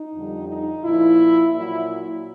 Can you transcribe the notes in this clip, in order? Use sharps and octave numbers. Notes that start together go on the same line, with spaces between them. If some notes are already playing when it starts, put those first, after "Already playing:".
Already playing: D#4
F2 D3 G3
D#4
A#2 F3 E4
A#2 F#3 E4